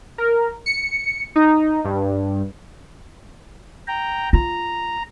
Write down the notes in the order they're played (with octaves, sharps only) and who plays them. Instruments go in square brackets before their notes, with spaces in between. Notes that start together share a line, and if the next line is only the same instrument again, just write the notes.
[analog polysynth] A#4
C#7
D#4
G2
[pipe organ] G5 A#5
[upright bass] F4 [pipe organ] A#5